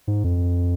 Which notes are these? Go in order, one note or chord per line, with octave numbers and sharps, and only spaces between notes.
G#2
F2